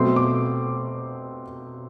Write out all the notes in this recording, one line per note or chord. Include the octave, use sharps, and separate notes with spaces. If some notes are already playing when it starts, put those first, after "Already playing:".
Already playing: B2 F#3 A3 C4 C6
D6